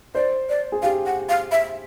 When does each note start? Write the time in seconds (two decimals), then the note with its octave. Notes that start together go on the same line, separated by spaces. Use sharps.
0.15 C5 D5
0.49 D5
0.72 G#4
0.82 G4 F5
1.06 F#5
1.29 F5
1.52 E5